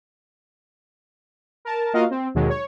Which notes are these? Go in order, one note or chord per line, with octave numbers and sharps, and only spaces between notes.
A#4 A5
A#3 F4 F#4 A#4 D#5 F5
C4
D#2 B2 D#3 F#3 G#3
C#5